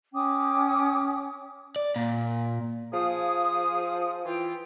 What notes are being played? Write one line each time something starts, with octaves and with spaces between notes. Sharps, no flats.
C#4 G5 D6 D#6
D5
A#2
F3 G#4 F5 D#6
E3 F4 G5